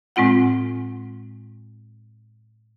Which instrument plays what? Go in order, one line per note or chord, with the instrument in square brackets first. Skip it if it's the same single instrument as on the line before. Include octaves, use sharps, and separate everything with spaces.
[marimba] A2 G#3 C4 F4 F#5